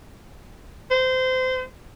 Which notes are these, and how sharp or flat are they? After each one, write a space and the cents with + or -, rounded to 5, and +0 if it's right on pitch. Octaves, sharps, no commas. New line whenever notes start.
C5 -25